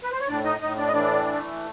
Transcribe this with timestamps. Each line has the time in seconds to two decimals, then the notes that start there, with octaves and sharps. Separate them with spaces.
0.03 B4
0.11 C5
0.20 C#5
0.28 A2 D4 D5
0.44 D#4 D#5
0.60 A2 D#4 D#5
0.78 D4 D5
0.87 D#5
0.93 E3 D4 D5
1.26 A3